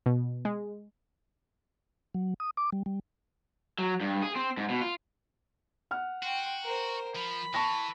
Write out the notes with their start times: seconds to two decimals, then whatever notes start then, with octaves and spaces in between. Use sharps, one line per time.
0.06 B2
0.45 G#3
2.14 F#3
2.40 D#6
2.57 D6
2.72 G3
2.86 G3
3.78 F#3
4.01 G2
4.22 G#4
4.36 C4
4.57 G#2
4.70 B2
4.81 F4
5.91 F#5 F6
6.23 F#4 G5 C6
6.64 A#4 C5
7.16 F3 B5
7.54 E3 A5 C#6 A#6